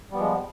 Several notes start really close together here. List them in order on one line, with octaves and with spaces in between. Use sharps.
G3 B3 F3 G#3